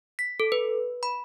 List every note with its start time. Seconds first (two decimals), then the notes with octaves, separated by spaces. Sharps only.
0.19 B6
0.40 A4
0.52 B4
1.03 B5